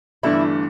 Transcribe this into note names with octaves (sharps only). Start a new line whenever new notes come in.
G1 G2 E3 A3 D4 E4